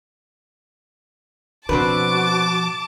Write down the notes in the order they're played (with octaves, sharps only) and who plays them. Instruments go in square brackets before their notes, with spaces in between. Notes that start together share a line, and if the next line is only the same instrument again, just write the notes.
[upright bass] B2 F3 [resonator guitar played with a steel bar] C4 D4 B4 [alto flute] F#4 [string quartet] A5 D6